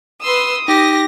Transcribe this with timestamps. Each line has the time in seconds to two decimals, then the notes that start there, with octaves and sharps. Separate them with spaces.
0.23 B4 C6 D#6 E6
0.68 D#4 G4 A#6